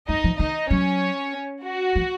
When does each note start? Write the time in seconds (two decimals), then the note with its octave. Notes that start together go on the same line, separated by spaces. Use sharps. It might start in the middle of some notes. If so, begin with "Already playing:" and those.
0.09 F#2 D#4 D#5
0.24 F3
0.39 D#3 D#4 D#5
0.70 F#3 C#4 C#5
1.64 F#4
1.96 F3